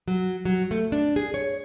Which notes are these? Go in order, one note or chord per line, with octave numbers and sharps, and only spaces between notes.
F#3
F#3
A3
D4
G#4
C#5